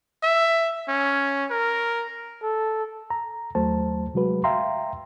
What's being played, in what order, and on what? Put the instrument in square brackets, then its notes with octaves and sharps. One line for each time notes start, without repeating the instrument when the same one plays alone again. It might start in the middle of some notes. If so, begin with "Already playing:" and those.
[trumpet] E5
C#4
A#4
[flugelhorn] A4
[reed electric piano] A#5
D#2 F#3 A3 C5 A5
C3 F#3 G#3 F#4 B4
E5 F5 G5 A#5 C6